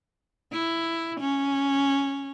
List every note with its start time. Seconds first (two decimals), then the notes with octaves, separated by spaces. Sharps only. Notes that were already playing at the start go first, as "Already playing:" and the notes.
0.52 E4
1.20 C#4